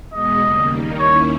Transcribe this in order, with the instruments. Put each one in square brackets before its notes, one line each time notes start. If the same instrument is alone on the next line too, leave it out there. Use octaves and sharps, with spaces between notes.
[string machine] E2 B2 G#3 B3 [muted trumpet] D#5
[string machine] D#2 C#3 G3 A#3
D#3 G3 A#3 D#4
[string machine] D#2 D#3 A#3 C#4 E4 [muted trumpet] C#5